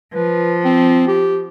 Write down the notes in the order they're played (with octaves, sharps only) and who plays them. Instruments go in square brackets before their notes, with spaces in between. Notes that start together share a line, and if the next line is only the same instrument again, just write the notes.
[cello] F3 [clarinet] B4
[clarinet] C4
G4